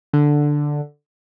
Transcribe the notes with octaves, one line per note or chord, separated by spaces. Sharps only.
D3